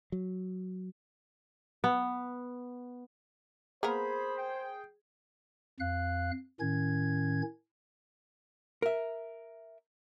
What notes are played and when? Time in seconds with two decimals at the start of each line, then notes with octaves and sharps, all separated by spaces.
0.12 F#3
1.84 B3
3.83 A#3 B3 G#4 A#4 C5 B5
4.37 G5
5.80 F2 F5 F#6
6.60 A2 D#3 C#4 G#6
8.82 A#4 E5